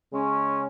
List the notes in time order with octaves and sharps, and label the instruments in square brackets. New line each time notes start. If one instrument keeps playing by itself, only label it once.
[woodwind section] C#3 G#3 C#4